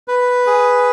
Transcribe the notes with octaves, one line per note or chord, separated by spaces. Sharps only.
B4
G#4